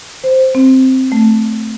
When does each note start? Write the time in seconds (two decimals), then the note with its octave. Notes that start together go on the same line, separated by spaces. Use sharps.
0.24 C5
0.55 C4
1.12 A3